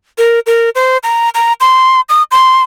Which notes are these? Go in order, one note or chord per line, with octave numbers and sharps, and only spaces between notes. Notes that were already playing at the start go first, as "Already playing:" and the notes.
A#4
A#4
C5
A#5
A#5
C6
D#6
C6